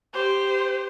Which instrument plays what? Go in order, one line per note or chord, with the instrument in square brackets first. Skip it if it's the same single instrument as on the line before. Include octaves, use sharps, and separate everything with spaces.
[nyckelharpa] G4 [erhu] C5